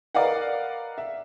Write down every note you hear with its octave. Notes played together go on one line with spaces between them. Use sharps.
A#4 B4 D5 D#5 F5 F#5
E5